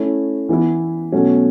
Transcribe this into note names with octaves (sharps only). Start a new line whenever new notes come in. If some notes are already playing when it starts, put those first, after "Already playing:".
Already playing: A3 C#4 E4
E3 B3 E4
B2 F#3 A3 C#4 F#4